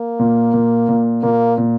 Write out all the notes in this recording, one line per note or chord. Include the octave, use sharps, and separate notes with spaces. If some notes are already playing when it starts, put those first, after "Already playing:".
Already playing: A#3
A#2
A#2
A#2
A#2 A#3
A#2